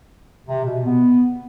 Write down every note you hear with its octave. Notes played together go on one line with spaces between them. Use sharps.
C3
B2
B3